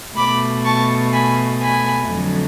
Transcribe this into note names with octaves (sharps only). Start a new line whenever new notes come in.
B2 A3 B5 D6
A5 C#6
G#5 B5
G#5 B5
F2 D3 F#3 A3